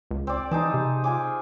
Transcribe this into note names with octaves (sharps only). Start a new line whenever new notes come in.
C#2
C4 D5
E3 D#4 G#4 A5
C3
F4 G#5 D6